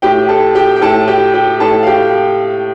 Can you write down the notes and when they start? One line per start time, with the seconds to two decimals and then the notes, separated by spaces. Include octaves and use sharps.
0.02 A2 G4 G5
0.29 A4 A5
0.55 G4 G5
0.76 G5
0.82 A2 A4 A5
1.08 G4 G5
1.34 G4 G5
1.60 A2 A4 A5
1.83 F5
1.87 G4 G5